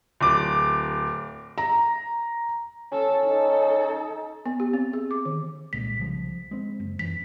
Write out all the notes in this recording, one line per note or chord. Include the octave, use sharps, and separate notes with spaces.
D1 D6
A#5
C#4 A4
D#4 A4
B3
G4
C4
G#4
D6
D#3
C2 A#2 G#3 B6
C2 C#3 F3
G#3 C4
F#1
E1 F#2 E3 B6